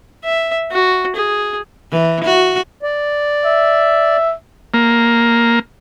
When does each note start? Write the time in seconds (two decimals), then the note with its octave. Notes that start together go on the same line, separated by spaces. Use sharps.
0.24 E5
0.71 F#4
1.16 G#4
1.92 E3
2.25 F#4
2.83 D5
3.45 E5
4.74 A#3